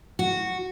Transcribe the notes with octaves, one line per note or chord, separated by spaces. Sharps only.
F#4